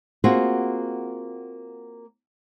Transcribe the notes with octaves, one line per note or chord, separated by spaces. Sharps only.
A#3 C4 F4 F#4 G#4